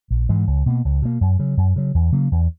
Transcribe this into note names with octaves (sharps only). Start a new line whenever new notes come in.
A#1
G#2 E3 G#3
C#2
B2 A#3
C#2
B2 A#3
F#2
C#3 F#3
F#2
C#3 F#3
E2
C#3 F#3 A#3
E2